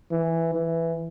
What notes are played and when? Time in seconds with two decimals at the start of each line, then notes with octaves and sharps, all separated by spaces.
0.11 E3
0.55 E3